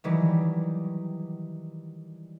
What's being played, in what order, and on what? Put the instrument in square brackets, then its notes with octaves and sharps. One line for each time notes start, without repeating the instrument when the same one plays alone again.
[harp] D#3 E3 F#3 G3